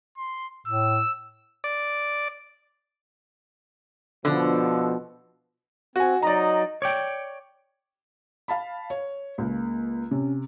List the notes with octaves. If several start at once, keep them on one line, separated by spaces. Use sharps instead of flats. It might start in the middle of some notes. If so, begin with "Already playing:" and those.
C6
A2 E6
D5
B2 D3 F3
C4 F#4 G#5
F#3 D#4 D5 D#5 A#5
C#5 D5 G5
F5 A5 B5
C#5
C#2 A#3
C3 C#4